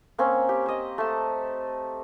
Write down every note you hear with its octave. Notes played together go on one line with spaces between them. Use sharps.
A#3 C4 C#4
G4
C5 D#5
A3 A5